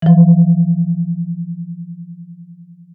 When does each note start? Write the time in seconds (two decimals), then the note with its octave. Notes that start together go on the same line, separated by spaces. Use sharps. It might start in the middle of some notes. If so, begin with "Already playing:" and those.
0.02 E3 F3